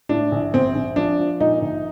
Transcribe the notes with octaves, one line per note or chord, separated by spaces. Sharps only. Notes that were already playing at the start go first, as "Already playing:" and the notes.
A2 D4
A#1
A#1 C4
A#1
F3 D4
F3
A#2 D#4
A#1